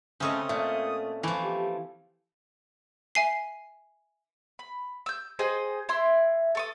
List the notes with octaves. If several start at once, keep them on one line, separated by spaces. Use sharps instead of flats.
C#3 A3 C4 C#4 A4 D#5 D#6
A#2 A3
E3 F3 A3
G4
E5 G#5 C7
B5
E6 G6
G#4 C5 D#5 G5
E4 E5 C6
A4 C#6 D#6